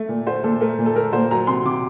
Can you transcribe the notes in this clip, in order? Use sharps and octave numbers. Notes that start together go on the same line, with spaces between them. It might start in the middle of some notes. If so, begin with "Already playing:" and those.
Already playing: A3
A#2
A3 C5
A#2 A4
A3 A#4
A#2
A4
A3 A#4
A#2 C5
F#3 A#5
C3 C6
C3 D6